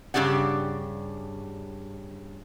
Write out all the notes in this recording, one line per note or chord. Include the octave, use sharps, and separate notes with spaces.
G2 C#3 G4 D5 F#5